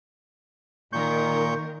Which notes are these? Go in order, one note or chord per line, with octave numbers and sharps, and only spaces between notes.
A#2 D#3 A#4 C#6 G6